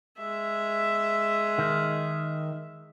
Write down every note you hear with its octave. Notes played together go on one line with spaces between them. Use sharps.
G#3 E5
D#3